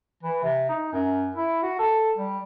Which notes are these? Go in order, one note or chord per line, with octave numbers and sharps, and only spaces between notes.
E3
C3
D#4
F#2
E4
F#4
A4
G3